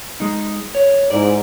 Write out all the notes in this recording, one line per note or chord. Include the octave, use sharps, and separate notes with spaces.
G#3 D#4
C#5
G#2 E4 D5